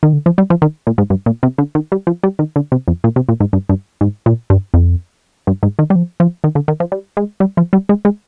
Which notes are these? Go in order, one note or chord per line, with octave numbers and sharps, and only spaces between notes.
D#3
D3
F3
G3
F3
D#3
A#2
G#2
G2
A#2
C3
D3
D#3
G3
F3
G3
D#3
D3
C3
F2
A#2
C3
A#2
G#2
G2
G2
G#2
A#2
G2
F2
G2
G#2
D#3
G3
F3
F3
D#3
D3
D#3
F3
G3
G#3
G3
F3
G3
G#3
G#3